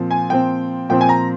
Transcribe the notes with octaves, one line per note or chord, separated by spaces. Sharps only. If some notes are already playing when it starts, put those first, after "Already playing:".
Already playing: A#2 F3 C4
G#5
A#2 F3 C4 G5
A#2 F3 C4 G5
G#5
A#5